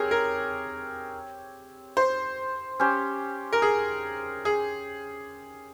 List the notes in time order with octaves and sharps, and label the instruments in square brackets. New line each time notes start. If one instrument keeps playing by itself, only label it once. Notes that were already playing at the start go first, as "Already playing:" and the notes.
Already playing: [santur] C4 G4 C#5 [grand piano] G#4 A#4
[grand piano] A#4
C5
[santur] C#4 G4 C5
[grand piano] A#4
G#4
G#4